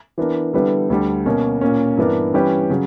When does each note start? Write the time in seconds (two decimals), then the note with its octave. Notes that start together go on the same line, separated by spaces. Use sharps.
0.18 E3 B3 D4 A#4
0.53 D3 G3 B3 E4 B4
0.90 D2 D3 G3
1.26 B2 A#3 C#4
1.61 A#2 A#3 C#4
1.97 G2 E3 B3 D4 A#4
2.34 E3 G3 C#4 G4 B4
2.70 C#3 F#3